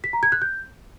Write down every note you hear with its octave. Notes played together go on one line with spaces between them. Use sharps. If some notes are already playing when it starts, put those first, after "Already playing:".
B6
A#5
G#6
F#6
G6